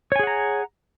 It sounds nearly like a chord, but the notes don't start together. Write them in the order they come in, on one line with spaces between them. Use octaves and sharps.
C#5 G#5 G#4 F#5 A#5